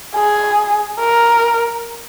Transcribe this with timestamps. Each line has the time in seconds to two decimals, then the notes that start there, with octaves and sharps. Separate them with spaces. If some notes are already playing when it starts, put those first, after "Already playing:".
0.15 G#4
0.99 A#4